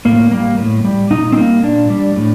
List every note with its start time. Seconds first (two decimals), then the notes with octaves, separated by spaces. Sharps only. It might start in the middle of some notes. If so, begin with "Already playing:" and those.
0.05 A2 A#3
0.31 G3 A#3
0.58 A2
0.85 G3
1.10 A#2 D#4
1.32 C4
1.37 G3 A#3
1.63 A#2 D4
1.90 G3
2.16 A2